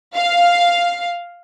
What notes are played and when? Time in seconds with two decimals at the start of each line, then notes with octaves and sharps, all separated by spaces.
0.15 F5